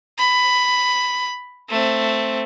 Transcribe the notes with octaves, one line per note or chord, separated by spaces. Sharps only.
B5
A3 C4